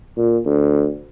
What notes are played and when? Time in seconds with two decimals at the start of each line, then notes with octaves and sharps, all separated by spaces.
0.17 A#2
0.46 D2